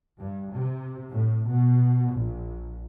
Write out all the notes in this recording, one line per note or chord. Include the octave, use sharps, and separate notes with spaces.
G2
C3
A2
B2
A#1